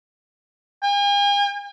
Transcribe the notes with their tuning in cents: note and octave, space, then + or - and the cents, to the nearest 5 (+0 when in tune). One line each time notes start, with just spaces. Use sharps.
G#5 -45